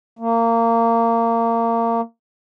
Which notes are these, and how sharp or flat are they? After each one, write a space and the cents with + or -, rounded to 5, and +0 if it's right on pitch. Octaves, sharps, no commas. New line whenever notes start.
A#3 -20